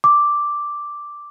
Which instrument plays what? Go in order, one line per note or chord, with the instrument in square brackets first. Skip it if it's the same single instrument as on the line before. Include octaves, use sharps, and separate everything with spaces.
[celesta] D6